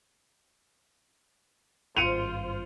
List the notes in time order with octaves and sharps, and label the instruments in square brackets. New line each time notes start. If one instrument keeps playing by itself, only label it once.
[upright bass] G#1 G2 [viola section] F4 C5 [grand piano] C#7 D#7 F7